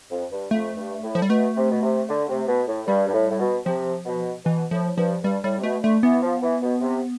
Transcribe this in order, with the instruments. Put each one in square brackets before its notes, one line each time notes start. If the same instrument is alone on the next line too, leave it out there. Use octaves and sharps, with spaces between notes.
[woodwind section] F2
G2
[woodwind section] F2 [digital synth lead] A3
[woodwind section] G2
A2
[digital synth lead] F3
G3
[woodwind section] B2 [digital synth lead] A3
[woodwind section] C3
B2
C3
D3
C3
B2
A2
[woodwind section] G2 [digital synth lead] G3
[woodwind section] G2
A2
A2
B2
[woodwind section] C3 [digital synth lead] F3
[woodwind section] B2
[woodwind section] B2 [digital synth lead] E3
[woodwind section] A2 [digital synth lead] F3
[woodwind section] G2 [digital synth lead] F3
[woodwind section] G2 [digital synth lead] G3
[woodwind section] A2 [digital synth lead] G3
[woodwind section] C3
[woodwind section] B2 [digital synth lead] A3
[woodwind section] D3 [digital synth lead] A3
[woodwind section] E3 [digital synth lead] B3
[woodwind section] F3
E3
B2
C3